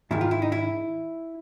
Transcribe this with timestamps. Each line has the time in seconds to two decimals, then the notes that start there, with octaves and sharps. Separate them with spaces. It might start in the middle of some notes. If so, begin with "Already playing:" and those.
0.11 G#2 D#3 E4
0.21 F4
0.31 E4
0.42 D#4
0.52 E4